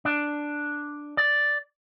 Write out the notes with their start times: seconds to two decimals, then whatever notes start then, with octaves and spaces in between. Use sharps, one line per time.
0.05 D4
1.17 D5